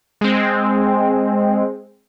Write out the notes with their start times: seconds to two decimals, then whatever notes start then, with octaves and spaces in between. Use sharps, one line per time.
0.21 G#3 C4